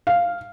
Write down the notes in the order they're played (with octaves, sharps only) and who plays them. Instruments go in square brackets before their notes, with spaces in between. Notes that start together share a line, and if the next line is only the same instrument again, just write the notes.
[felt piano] F5